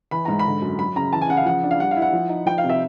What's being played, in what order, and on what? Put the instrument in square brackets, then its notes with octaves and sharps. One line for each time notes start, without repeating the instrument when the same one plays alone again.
[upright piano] E3 B5
G#2 A#5
B5
D3
F#2
F#3 B5
C#3 A#5
E3 A5
G#5
C#3 F#5
F5
F3 F#5
D4
F5
G3 F#5
F5
E4
F#5
F3
D#4
F3 G5
F5
C3
E5